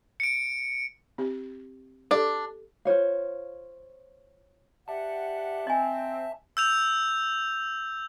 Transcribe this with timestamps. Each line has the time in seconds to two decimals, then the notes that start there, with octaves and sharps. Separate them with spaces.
0.20 C#7 D7
1.18 C4 G4
2.11 D4 G4 A4 D5
2.85 F4 C5 C#5 F5
4.88 G4 D5 E5 F#5 A5
5.67 C4 D#5 G#5
6.57 E6 G6 F7